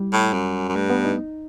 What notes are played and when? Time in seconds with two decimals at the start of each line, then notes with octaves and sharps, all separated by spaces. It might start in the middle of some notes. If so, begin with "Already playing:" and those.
Already playing: G3 E4
0.13 A2
0.33 F#2
0.69 F#2
0.76 G2 A3
0.90 B3
1.05 D#4